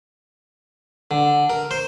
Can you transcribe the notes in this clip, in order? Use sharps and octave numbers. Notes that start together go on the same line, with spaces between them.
D3
A#4
C5